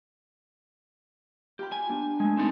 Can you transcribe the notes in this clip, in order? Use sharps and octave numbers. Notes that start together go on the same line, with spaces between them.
F4 G4 G5 B5
G#5
B3 D4 F4
G#3 A3 G#5
C4 D#4 A4